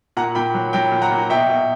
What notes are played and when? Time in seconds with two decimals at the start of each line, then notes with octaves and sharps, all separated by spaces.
0.17 A#2 F#5 A#5
0.35 A#2 G5 B5
0.54 F#3
0.73 F#3 G5 B5
0.92 A#2
1.02 F#5 A#5
1.11 A#2
1.30 B2 E5 G5
1.49 B2